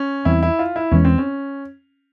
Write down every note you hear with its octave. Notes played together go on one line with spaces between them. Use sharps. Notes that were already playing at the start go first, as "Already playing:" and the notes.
Already playing: C#4
E2 E3 G3 C4 E4
E4
F4
E4
E2 E3 G#3 C#4
C4
C#4